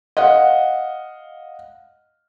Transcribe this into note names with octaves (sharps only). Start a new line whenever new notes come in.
D#5 F5 F#5